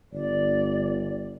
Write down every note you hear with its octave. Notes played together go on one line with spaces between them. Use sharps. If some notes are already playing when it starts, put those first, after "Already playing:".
G1 D5